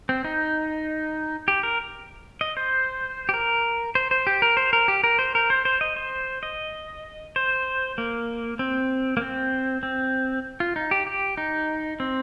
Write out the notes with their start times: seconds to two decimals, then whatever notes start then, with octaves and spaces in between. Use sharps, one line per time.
0.09 C4
0.24 D#4
1.48 G4
1.63 A#4
2.41 D#5
2.57 C5
3.29 G4
3.34 A#4
3.95 C5
4.11 C5
4.27 G4
4.42 A#4
4.57 C5
4.73 A#4
4.88 G4
5.04 A#4
5.19 C5
5.35 A#4
5.50 C5
5.65 C5
5.81 D#5
5.96 C5
6.43 D#5
7.36 C5
7.98 A#3
8.59 C4
9.17 A#3
9.21 C4
9.83 C4
10.60 F4
10.76 D#4
10.91 G4
11.07 G4
11.37 D#4
12.00 C4